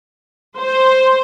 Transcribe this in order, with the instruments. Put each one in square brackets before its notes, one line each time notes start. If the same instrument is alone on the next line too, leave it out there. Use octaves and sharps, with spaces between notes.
[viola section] C5